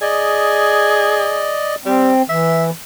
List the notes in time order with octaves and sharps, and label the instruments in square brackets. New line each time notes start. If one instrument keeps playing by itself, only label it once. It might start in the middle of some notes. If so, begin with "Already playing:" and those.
[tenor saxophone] G#4 [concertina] D5 D#5
[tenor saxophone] G3 [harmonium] C4
[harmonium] E3 [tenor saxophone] E5